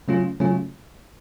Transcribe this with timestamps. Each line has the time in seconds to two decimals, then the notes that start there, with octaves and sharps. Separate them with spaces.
0.08 C#3 F#3 A3 C#4 F4
0.40 C#3 F#3 A3 C#4 F4